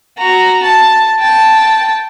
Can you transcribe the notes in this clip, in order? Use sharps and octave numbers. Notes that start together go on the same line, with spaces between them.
F#4 A#5
A5
G5 A5